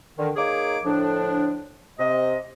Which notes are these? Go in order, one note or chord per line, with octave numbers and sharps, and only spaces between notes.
D3 D#3
A#3 D#4 G#4 C#5 D6
A2 D3 F3 D4
C3 D#5